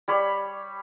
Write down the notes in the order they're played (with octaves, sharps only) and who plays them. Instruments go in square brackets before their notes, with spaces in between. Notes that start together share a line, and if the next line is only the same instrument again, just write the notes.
[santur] G3 C#5 B5